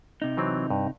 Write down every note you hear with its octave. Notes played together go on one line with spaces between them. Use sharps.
C3 D#4
E3 F#3 C4
G2